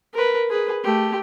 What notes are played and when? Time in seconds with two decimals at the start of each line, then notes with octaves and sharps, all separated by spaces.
0.13 A#4 B4
0.50 G#4 B4
0.83 A3 G4